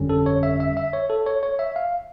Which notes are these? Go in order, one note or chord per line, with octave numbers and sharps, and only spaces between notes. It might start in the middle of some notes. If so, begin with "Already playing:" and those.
Already playing: G1 F2 D3 G3 C#4
A4
C#5
E5
E5
E5
C#5
A4
C#5
C#5
E5
F5